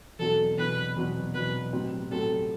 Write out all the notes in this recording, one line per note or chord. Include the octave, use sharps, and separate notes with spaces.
E2 B2 F#3 C4 A4
E2 B2 F#3 C4 B4
E2 B2 F#3 C4
E2 B2 F#3 C4 B4
A2 F#3 C4 G4
A2 F#3 C4 G4 A4